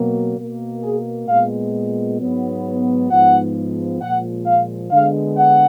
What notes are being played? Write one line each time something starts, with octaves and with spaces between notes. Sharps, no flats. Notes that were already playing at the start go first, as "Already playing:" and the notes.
Already playing: B2 F#3 A#3
B2 A#3
G#4
A#2 G#3 B3 F5
G#2 F#3 B3
G#2 F3 B3 F#5
A#2 F3 G#3 F#5
F5
D3 G#3 B3 F5
F#5